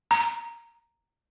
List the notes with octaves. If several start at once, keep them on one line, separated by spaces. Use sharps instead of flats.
A#5